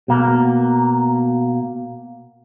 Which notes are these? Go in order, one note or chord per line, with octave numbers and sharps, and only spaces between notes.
B2 A#3